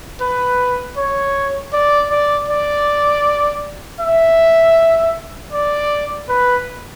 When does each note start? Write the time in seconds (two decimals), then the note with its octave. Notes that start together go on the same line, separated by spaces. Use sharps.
0.21 B4
0.97 C#5
1.73 D5
2.10 D5
2.48 D5
4.00 E5
5.52 D5
6.29 B4